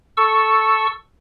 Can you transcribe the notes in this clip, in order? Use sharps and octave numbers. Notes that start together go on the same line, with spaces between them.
A4 C#6 E6